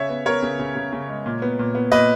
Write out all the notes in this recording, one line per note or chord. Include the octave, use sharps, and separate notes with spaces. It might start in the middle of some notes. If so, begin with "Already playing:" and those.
Already playing: C#3 C#5 E5
B3
B3 A#4 C#5
C#3
C#3
C#3
C#3
G#3
A#2
B3
A#2
B3
A#2 B4 D#5